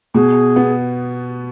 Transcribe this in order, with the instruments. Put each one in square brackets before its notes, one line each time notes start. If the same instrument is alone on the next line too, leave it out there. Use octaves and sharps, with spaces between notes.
[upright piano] B2 [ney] G#4
[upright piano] B3